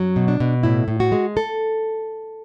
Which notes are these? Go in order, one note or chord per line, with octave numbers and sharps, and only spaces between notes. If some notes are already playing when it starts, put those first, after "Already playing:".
Already playing: F#2 F#3
B2
D4
B2
A2 E4
A2
F#4
G#3
A4